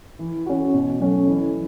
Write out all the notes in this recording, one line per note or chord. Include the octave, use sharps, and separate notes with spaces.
E3
C#4 F#4
B2
F#3 A3 C#4
E3